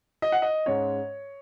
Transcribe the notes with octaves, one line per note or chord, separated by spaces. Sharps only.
D#5
F#5
D#5
G#2 G#3 C#4 C#5